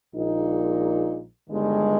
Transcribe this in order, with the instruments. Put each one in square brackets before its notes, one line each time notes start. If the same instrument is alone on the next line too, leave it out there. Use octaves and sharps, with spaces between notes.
[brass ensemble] A#1 A#2 G#3 D#4
G1 G2 D#3 G#3